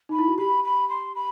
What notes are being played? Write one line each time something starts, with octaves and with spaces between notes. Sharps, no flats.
D#4 B5
E4
F#4
G4 B5
B5
C6
B5